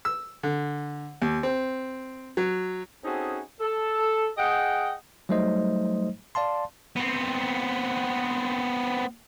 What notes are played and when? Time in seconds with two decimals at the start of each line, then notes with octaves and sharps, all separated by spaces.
0.05 E6
0.43 D3
1.22 D#2
1.43 C4
2.37 F#3
3.04 C4 C#4 D#4 F#4 G#4 A4
3.60 A4
4.37 G#4 D#5 F#5 G5
5.29 F#3 G3 A3 D#4 C5 D#5
6.35 D5 F5 A5 C6
6.96 B3 C4